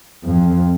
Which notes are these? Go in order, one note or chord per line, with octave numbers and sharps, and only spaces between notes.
F2